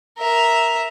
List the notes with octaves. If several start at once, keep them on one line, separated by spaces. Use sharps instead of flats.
A#4 E5